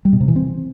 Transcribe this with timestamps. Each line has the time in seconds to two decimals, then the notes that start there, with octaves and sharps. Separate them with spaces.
0.05 G3
0.13 B2
0.20 C3
0.28 E3
0.36 C4